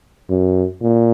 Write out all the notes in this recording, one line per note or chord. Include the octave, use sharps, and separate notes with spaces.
F#2
A#2